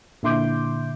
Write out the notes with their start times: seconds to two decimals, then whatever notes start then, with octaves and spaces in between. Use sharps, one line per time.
0.23 A#2 D3 E4 C6 D6 G6